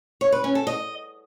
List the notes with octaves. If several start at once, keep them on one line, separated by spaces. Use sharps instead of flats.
C#5
B4
C#4
A4
D#5